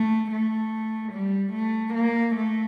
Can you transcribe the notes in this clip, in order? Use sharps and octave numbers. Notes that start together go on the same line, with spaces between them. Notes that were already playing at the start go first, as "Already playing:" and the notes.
Already playing: A3
A3
G3
A3
A#3
A3